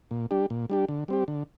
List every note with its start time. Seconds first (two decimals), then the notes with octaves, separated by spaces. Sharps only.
0.11 A#2
0.31 G3 D4 G4
0.50 A#2
0.70 G3 D4 G4
0.88 D3
1.08 G3 C4 G4
1.28 D3